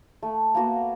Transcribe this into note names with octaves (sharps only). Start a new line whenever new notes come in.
A3
A#3 B3 F#4